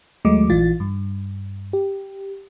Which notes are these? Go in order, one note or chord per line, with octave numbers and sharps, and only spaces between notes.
D#2 F#3 G#3 A3 D#5 D6
A#1 E3 F4 A6
G2
G4